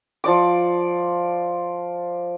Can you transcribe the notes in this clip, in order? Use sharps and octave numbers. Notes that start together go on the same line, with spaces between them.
F3 D5 D6